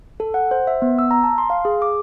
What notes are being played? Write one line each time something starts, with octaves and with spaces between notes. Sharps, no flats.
A4
F#5
C5
E5
B3
E6
A#5
A5
C6
F5
G#4
D6